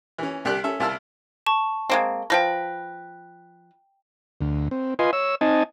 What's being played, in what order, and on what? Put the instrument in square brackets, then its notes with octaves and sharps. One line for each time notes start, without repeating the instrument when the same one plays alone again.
[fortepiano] E3 C#4
C2 G4 D5 F#6
C#4 A4 E5
C2 E4 F5 A5 E6 F6
[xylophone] A5 C#6
[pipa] G#3 A#3 C4
[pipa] F3 B4 [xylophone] G5 A#6
[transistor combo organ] D2
C4
F4 B4 D#5 G#5 C6
C#5 E6
C4 D#4 D#5 G#5 A5